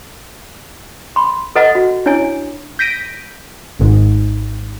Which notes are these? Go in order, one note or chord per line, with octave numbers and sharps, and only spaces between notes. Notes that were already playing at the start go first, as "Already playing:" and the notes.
B5 C6
A4 B4 D#5 F#5 A#5
F#4
D4 E4 C#5 G#5
G6 A#6 B6 D7 D#7
G#1 G#2